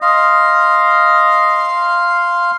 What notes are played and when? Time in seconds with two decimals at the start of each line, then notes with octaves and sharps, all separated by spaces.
0.02 D#5 F5 C6